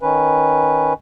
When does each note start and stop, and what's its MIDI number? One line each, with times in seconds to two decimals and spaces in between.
0.02 0.94 51
0.02 0.94 61
0.02 0.94 71